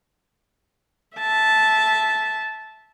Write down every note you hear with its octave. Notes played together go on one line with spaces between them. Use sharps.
E5 A5